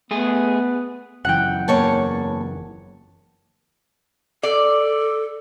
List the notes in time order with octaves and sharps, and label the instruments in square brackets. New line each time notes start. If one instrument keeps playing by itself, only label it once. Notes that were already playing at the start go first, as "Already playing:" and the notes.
[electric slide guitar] A3 G#4 [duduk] B3
[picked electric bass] F#1 F#2 E3 [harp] F#5 G5
[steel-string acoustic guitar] E2 C#5 A5 [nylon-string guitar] A#3
[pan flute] A4 [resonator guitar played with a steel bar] D5